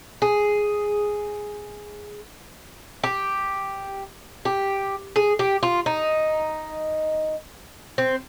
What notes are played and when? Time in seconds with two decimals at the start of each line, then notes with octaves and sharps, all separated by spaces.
0.22 G#4
3.04 G4
4.45 G4
5.16 G#4
5.39 G4
5.63 F4
5.86 D#4
7.98 C4